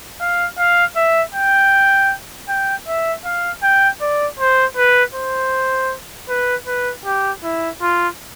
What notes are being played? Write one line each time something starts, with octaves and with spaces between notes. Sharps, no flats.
F5
F5
E5
G5
G5
E5
F5
G5
D5
C5
B4
C5
B4
B4
G4
E4
F4